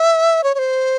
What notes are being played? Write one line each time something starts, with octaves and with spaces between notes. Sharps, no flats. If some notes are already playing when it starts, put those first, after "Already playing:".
Already playing: E5
C#5
C#5
C5